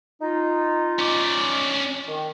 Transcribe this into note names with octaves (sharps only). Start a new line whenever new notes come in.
D#4 F4
C#4 D5
D#3